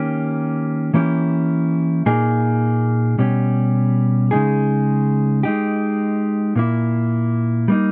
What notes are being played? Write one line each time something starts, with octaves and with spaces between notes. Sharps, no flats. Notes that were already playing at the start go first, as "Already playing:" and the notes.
Already playing: D#3 A#3 C#4 G4
E3 A#3 C#4 E4 G4
A#2 A#3 D#4 G#4
B2 G3 C#4 G4
C#3 G#3 D#4 G#4
G#3 D#4 G4
A#2 A#3 E4
G3 A#3 D#4